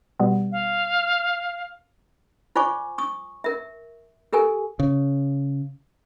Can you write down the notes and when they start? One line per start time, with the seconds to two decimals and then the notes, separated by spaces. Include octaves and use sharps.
0.20 B2 G3 B3
0.52 F5
2.56 F4 C5 D5 G#5 C#6 D6
2.98 C#6 D#6
3.44 A#4 E5
4.33 G4 A4 A#4 G#5
4.80 C#3